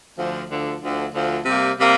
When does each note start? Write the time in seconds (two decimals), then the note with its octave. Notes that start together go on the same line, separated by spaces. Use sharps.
0.17 D2 D3 F3
0.49 D2 D3 F3
0.81 D2 D3 F3
1.13 D2 D3 F3
1.45 C3 G3 A#3
1.78 C3 G3 A#3